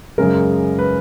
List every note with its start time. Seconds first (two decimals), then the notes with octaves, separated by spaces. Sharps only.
0.18 F#2 C#3 G#3 A#4
0.79 B4